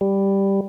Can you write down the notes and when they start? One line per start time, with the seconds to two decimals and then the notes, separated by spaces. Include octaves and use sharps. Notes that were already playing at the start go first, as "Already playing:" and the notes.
0.01 G3